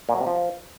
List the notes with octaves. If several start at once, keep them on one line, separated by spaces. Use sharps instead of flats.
A#2
F#3
C3
F3